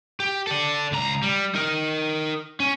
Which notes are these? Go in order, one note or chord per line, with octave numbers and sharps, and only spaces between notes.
G4
A4 D5
C#2 A#5
G3
D#4 A#4
C#4